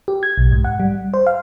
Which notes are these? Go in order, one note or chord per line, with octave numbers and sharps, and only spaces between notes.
G4
G#6
B1
G#2
F#5
G3
C5
F5